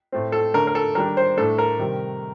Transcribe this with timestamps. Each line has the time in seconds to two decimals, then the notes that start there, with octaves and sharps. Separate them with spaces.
0.12 A2 A3 C4
0.32 A4
0.54 D3 A3 D4 A#4
0.67 A#4
0.75 A4
0.95 D#3 G3 D4 A#4
1.17 C5
1.37 A2 A3 D4 A4
1.58 A#4
1.79 C3 D#3 G3